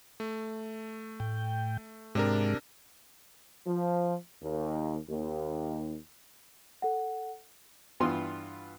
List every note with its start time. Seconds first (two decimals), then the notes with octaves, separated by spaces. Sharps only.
0.20 A3
1.20 A2 G5
2.15 G#2 C3 G#3 D4 A#4
3.67 F3
4.43 D#2
5.09 D#2
6.82 A4 F#5
8.00 G2 E3 B3 F4 C6